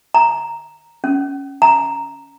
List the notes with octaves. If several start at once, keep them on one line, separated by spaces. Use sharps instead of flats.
A#5
C#4
A#5